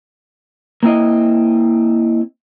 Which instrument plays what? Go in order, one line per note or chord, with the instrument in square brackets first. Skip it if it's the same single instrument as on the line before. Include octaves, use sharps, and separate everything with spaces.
[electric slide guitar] A#3 C4 E4 D#5